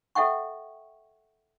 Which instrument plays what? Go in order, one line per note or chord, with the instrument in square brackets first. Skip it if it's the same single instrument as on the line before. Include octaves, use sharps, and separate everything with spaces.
[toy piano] A4 E5 F#5 G5 C#6